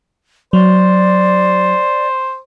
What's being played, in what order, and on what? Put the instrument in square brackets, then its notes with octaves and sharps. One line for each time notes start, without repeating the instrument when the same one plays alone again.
[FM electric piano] F#3 [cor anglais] C5 [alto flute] D5